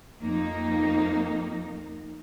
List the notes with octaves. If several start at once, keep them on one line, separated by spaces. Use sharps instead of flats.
F2 A#3 D#4